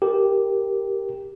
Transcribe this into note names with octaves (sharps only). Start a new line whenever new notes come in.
G4 A#4